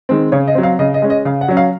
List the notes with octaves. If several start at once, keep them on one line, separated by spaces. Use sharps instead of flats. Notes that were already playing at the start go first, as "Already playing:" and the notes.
D#3 G#3 C4
C#3 C#5
D#5
F#3 C4
F5
C#3 D#5
D#5
G#3 C#4
D#5
C#3 F5
F#5
F#3 C#4
F5